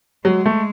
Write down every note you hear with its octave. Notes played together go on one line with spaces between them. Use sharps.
F#3 G#3
A3